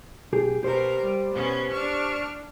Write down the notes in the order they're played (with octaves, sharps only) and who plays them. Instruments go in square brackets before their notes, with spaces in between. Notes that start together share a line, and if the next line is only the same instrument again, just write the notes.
[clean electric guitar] B1 G4 G#4
[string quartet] B2 A#4 [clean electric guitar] G4 C5
[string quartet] G3
B2 B3 C#4
D4 C#6 F6